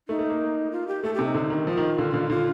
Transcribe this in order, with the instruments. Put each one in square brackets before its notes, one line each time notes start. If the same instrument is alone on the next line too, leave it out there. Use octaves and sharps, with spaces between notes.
[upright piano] A3 [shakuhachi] D#4
[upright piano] A3
A#3
[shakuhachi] F4
G4
[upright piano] A3 [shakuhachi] A4
[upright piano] C3 [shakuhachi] G4
[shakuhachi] D#4
[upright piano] D3
D#3
[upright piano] F3 [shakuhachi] F4
[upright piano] D#3
D3
D3
[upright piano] D3 [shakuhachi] F4